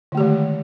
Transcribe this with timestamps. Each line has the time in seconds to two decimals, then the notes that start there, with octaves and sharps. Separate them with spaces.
0.12 D3
0.15 A3
0.17 G4
0.20 D#3
0.23 G#3